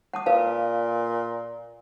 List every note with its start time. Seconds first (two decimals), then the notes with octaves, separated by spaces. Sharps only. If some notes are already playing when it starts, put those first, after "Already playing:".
0.14 F#5 A5 D#6
0.26 A#2 B4 F5 A5